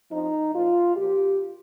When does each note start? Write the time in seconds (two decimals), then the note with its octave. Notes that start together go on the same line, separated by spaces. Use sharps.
0.12 F2 F3 D#4
0.53 A#2 F3 F4
0.96 A#2 F3 G4